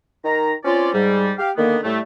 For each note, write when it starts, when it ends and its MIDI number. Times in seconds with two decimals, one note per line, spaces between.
0.25 0.53 51
0.25 0.53 82
0.65 0.93 60
0.65 0.93 61
0.65 0.93 65
0.65 0.93 74
0.94 1.32 44
0.94 1.32 55
1.38 1.51 67
1.38 1.51 77
1.57 1.77 50
1.57 1.77 51
1.57 1.77 58
1.57 1.77 59
1.84 1.99 45
1.84 1.99 55
1.84 1.99 57